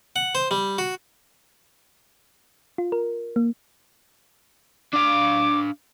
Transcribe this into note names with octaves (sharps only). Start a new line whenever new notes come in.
F#5
C5
G3
F#4
F4
A#4
A#3
D4 F5 D6